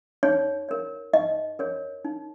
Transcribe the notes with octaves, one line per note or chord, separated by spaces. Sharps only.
D#4 C#5
A#4 C#5
D#4 D#5
A#4 C#5
D#4